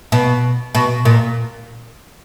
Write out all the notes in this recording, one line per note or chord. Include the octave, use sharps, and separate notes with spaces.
B2
B2
A#2